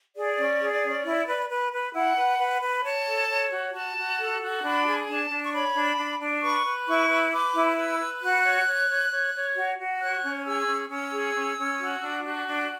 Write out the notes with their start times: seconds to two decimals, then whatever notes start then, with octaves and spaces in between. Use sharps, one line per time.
0.16 G#4 D5
0.38 C#4
0.60 G#4
0.83 C#4
1.05 E4
1.27 B4
1.50 B4
1.72 B4
1.94 E4 F#5
2.17 B4
2.39 B4
2.62 B4
2.84 C#5 A5
3.06 A4
3.29 C#5
3.51 F#4
3.73 F#4 A5
3.96 F#4
4.18 A4
4.42 F#4
4.63 D4 B5
4.85 G#4
5.08 D4 A5
5.30 D4
5.43 C#6
5.52 C#5 B5
5.75 D4
5.97 D4
6.20 D4
6.42 B4 C#6
6.65 B4
6.87 E4 C#6
7.10 B4
7.32 B4 D6
7.55 E4
7.76 B4 E6
7.99 B4
8.21 F#4 F#6
8.44 C#5
8.66 C#5
8.89 C#5
9.11 C#5
9.34 C#5
9.55 F#4
9.78 F#4
10.00 C#5 F#6
10.23 C#4
10.45 G#4 E6
10.67 C#4
10.90 C#4 E6
11.13 G#4
11.35 C#4
11.57 C#4
11.79 F#4
12.02 D4
12.25 F#4
12.47 D4